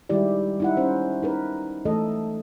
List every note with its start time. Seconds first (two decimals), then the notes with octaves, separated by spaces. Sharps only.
0.09 D#3 G3 G#3 E4 G4 D5
0.60 D#4 E4 F#5
0.77 C#4 C5
1.23 D#4 A#4 B4
1.85 E3 G#3 A3 A4 D#5